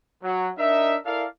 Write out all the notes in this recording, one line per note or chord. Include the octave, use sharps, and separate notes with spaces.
F#3
D4 D#4 A#4 D#5 E5
E4 A4 A#4 D5 F5